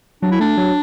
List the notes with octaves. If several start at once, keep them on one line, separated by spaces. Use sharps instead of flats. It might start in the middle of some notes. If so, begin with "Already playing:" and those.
F#3 D4
E4
A3 D4
F#3